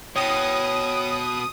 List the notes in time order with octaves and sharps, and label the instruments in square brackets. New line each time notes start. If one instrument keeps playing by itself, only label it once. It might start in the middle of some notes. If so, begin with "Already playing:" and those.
[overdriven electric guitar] B2 [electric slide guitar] C#5 G5 [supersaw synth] D#6